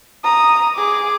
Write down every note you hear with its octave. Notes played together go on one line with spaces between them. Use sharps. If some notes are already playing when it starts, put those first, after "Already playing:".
A#5 D#6
G#4 D6